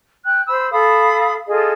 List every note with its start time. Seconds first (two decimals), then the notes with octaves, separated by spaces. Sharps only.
0.24 G5 F#6
0.47 C5 B5 E6
0.71 A4 F5 B5 D#6
1.48 F4 G#4 A4 D#5